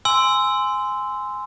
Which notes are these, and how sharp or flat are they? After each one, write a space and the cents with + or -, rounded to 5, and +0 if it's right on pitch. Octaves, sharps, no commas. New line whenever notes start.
G#5 +0 C6 -15 E6 +0